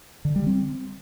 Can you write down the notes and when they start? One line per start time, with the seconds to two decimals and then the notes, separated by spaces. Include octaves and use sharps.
0.25 D3
0.36 G3
0.47 C4